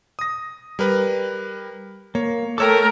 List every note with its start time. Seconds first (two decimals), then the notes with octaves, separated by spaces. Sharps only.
0.19 D#6 A#6
0.79 G3 A#4 B4
2.15 A#3 C#5
2.58 A3 A4 A#4 C#5 G5 D6 E6